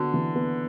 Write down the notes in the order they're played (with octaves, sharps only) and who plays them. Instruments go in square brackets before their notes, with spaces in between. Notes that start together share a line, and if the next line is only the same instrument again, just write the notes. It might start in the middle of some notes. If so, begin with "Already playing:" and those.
Already playing: [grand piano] D3 [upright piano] B3 F#4
[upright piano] E3
B3